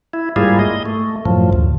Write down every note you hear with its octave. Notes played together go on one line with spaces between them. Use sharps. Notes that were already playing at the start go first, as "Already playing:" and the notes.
E4
G#2 G3 A#3 E4 F4 G#4
D#5
A3
F#2 A2 F3
D2